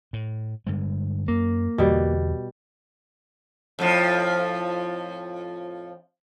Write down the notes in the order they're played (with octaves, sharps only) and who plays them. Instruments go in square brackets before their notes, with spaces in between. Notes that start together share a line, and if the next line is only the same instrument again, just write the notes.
[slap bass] A2
G2 D3 G#3
[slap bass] F#2 [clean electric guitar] A#3
[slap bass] E2 D3 [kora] B2 G3
[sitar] F2 A2 F3